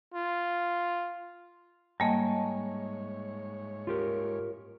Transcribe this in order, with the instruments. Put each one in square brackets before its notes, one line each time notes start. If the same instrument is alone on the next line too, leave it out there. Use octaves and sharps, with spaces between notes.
[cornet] F4
[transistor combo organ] G#2 C#5 [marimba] G3 A#3 [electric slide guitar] D#5 G#5 A5
[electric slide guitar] F4 G4 A#4